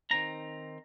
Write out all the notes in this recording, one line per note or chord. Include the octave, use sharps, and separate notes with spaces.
D#3 C4 D#4 A#5